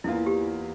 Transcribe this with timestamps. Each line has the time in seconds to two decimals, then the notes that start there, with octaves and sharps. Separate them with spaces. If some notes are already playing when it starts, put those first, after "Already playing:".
0.04 E2 E3 A#3 E4 F4
0.15 E4
0.26 G4